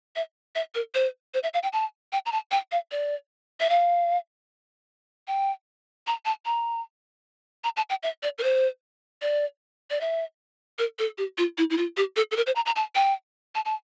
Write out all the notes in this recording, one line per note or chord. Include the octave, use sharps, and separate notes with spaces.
E5
E5
A#4
C5
C5
E5
F5
G5
A5
G5
A#5
A5
G5
F5
D5
E5
F5
G5
A#5
A5
A#5
A#5
A5
G5
E5
D5
A#4
C5
D5
D5
E5
A#4
A4
G4
F4
E4
E4
F4
G4
A4
A4
A#4
C5
A#5
A#5
A5
G5
A5
A5